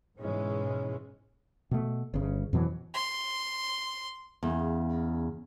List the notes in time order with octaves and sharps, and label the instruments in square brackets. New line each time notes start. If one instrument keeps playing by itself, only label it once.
[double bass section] G#2 B2 E3 G#3 C#4
[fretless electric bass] B2 A3
G1 C#3
F2 B2 E3 F#3
[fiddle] C6
[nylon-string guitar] E2 C#3